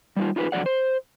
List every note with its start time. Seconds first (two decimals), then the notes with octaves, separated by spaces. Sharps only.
0.16 G3 D#4 F4
0.36 D#4 F4 G#4 B4
0.52 F2 D3 F#3 G#4 D5 F#5
0.66 C5